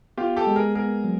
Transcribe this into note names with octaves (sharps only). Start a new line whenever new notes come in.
B3 F4 G4
G4 A4
G#3
G#4 A#4
B3 G#4 A#4
F#3